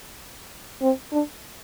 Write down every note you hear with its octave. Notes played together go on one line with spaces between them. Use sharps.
C4
D4